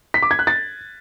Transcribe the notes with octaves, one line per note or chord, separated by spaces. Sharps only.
B6
D6
G#6
F#6
A6